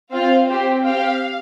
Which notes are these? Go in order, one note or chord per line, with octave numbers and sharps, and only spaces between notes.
C4 F4 F5
C4 G4 C5
C4 G4 F5